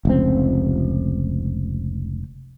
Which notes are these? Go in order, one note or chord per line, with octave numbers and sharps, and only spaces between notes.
F1 C#2 C4